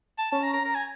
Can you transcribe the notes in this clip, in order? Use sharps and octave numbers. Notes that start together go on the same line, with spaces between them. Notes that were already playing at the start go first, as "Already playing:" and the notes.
A5
C#4 A5
A#5
A#5
A#5
G#5